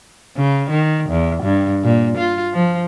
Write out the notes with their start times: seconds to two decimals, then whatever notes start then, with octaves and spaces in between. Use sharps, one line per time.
0.37 C#3
0.70 D#3
1.10 E2
1.43 G2
1.84 A#2
2.18 F4
2.54 F3